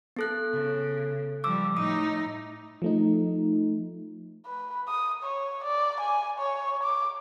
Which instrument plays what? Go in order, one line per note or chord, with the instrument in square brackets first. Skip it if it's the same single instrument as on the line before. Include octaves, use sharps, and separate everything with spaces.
[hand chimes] B3 A4 F#6
[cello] C#3
[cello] F3 G3 [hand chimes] D6 E6
[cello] A2 D#4 [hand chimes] D#6
[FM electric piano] F3 A3 D#4
[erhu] B4
D#6
C#5
D5
G#5
C#5
D6